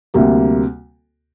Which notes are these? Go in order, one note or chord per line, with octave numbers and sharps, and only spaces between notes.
D2 C3 G3 A#3